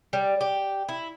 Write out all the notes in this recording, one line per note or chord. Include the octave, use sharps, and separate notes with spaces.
G3
G4
E4